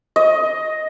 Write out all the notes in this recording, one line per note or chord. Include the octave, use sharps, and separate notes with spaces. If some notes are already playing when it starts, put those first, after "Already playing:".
D#5